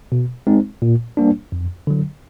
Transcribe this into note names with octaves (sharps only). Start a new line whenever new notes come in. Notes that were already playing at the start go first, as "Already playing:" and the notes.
B2
G#3 C4 D#4
A#2
G3 A#3 D4
F2
D3 F#3